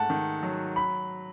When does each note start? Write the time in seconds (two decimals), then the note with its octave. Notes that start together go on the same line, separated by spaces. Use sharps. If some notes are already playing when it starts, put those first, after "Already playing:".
Already playing: G#2 A3 F#5 A5
0.10 D#3
0.43 F#3
0.76 B5